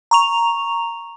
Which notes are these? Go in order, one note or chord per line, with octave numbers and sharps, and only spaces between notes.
A#5 C#6 F7